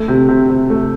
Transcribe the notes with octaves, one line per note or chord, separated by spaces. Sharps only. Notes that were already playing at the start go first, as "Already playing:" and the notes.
Already playing: A3
C3
C3
C3
A3